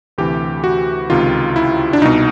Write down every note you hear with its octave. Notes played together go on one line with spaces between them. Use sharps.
D2 C3 E3 G4
F#4
C#2 C3 D#3 F4
E4
D4
C2 B2 D#4